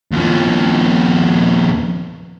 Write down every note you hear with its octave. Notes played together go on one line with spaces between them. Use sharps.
D#2 F3